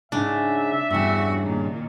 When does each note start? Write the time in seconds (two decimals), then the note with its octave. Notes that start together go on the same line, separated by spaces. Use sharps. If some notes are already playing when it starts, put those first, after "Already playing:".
0.12 G#2 C#3 D4 E5
0.91 E2 G2 C#3 F#4
1.42 A#2 D#3